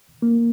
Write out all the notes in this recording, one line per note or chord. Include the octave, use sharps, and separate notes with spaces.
A#3